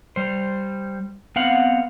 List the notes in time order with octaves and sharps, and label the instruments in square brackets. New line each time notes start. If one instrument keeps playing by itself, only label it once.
[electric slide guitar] G3 C5
B3 C4 F5 F#5